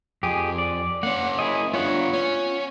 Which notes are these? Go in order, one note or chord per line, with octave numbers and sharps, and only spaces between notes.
F2 G4 G#4
D5
A#3 C#4 F#5
E4 G#4 D#5
B3 D4 F4 C#5 F#5
C#4